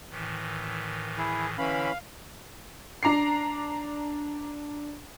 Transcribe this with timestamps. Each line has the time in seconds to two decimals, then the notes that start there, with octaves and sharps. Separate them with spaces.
0.10 A2 D#3 E3
1.18 E4 G#4
1.58 D3 E3 C#4 F5 B5
3.03 D4 A#5 D6 C7